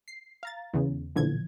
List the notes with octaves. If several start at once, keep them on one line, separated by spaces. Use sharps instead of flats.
C7
F5 A#5 A6
E2 C#3
B1 A#2 D3 E3 F3 G#6